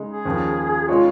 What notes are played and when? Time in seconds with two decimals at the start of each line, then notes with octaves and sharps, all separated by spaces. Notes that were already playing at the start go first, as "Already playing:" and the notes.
Already playing: C#3 G#3 D#4
0.10 G#4
0.25 D#2 C#3 F3
0.88 C#3 G#3 D#4 F4 C#5